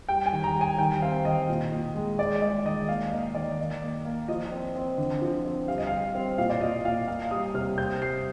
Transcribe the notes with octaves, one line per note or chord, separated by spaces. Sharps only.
G3 G5
G#5
D#3
A#5
G3
G#5
D#3 G5
C4 F5
D#3 D#5
A#2
A#2
G#3
G#3 D5
G#3 D5
D#3 D#5
A#3 F5
A#3 D#5
D#3 D5
D#3
A#3
A#3
F3 D#5
C4
C4
D3
F3
C4
G3 F5
D#5
F5
G3
C4
A#2 F5
D5
A#2 D#5
A#2 F5
A#3 F5
G3 D#6
C3 F6
C4 G6
G3 C7